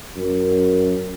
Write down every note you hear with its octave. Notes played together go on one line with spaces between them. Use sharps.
F#2